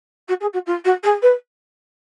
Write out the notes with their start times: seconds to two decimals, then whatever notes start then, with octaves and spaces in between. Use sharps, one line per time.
0.28 F#4
0.40 G#4
0.53 F#4
0.66 F4
0.84 F#4
1.03 G#4
1.22 B4